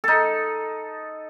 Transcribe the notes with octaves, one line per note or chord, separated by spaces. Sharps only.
D#4 A4